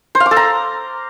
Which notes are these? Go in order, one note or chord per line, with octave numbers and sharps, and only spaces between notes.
C5
F5
D6
A4
A#5